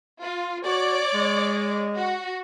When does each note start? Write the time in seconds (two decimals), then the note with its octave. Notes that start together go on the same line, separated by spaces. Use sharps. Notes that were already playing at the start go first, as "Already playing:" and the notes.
0.21 F4
0.65 F#4 C#5 D5 D6
1.13 G#3
1.97 F#4